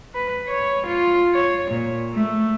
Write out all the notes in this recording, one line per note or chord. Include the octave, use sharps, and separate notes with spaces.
B4
C#5
F4
C#5
A#2
A3